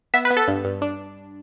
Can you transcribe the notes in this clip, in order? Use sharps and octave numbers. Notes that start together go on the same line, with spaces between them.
B3 E5
B4
B3
A4
G2
G2
D4